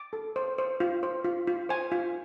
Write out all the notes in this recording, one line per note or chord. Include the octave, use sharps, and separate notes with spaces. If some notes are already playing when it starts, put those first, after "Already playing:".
Already playing: D6
A4
C5
C5
F4
C5
F4
F4
C5 G#5
F4